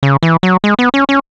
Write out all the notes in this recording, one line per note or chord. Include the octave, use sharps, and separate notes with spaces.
C#3
E3
F#3
G#3
B3
C#4
C#4